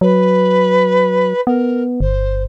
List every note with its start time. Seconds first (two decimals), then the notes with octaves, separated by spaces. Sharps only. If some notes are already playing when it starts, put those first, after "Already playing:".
0.01 F#3 B4
1.47 B3 A#4
2.00 G1 C5